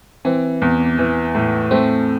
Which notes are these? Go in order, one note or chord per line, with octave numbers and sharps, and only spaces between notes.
E3 C4
E2
E3
A2
A3 C4